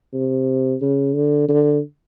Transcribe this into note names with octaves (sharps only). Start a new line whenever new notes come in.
C3
C#3
D3
D3